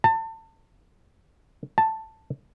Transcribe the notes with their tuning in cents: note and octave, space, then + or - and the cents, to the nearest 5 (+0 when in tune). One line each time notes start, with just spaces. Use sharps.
A5 +30
A5 +5